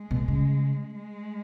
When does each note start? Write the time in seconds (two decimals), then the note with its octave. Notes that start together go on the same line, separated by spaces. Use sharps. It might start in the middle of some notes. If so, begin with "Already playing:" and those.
Already playing: G#3
0.11 B2
0.28 C#3
0.96 G#3